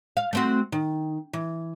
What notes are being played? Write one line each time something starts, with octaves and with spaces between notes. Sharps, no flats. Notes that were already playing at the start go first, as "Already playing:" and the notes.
F5
A3 C4 F#4
D#3
E3